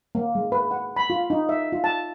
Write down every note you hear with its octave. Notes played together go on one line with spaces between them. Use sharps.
A#3
G#3
B4
F#5
B5
F4
D#4
E5
F4
A5